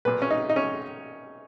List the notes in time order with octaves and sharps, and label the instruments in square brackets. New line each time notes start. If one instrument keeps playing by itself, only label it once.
[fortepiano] B1 A#2 B4
C#4
D#4
D#4
C#4